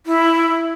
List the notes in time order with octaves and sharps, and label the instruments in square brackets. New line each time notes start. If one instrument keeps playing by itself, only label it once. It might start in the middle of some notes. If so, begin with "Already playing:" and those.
[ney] E4